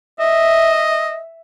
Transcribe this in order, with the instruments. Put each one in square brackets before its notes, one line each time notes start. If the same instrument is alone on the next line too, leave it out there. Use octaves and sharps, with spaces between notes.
[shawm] D#5 [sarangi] E5